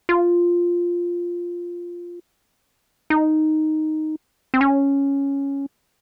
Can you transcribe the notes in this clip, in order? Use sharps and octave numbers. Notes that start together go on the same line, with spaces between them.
F4
D#4
C4
C#4